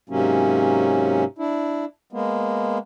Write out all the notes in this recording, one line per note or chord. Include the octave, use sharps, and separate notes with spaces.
G#2 C3 F#3 A#3 C#4
D4 E4
G#3 A#3 B3